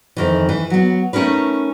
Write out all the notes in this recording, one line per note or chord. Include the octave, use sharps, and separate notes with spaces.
F2 D#3 E3
E3
F#3 B3
A3 C#4 D#4 A#4 B4